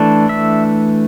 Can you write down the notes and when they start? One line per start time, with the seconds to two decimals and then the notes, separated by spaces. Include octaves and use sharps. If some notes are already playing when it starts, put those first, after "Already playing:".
Already playing: E3 A3 D4
0.29 E5